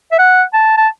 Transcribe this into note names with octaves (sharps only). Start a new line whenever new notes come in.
E5
F#5
A5
A5